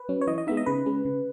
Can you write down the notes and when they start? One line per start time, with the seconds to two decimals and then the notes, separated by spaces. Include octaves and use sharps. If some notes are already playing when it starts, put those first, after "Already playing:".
Already playing: B4
0.09 F#3 C#4
0.21 C#5
0.27 E3 D#5
0.38 D#5
0.47 G#3 B3 D#4 E5
0.57 D#5
0.66 C#3 B4
0.86 G#3 C#4
1.05 C#3